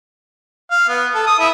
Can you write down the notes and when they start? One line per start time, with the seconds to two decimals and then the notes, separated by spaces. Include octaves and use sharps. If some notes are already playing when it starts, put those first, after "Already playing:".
0.71 F5
0.89 B3
1.15 A4
1.27 D#6
1.39 E4